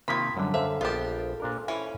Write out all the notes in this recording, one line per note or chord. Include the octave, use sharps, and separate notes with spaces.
C3 D#3 F3 A#3 B5 C6 B6
F#2 D3 F#3 G3 D4
A4 C5 E5 F5
A#1 B3 F4 G4 A5
A#2 D4 A#4
E3 C#4 E4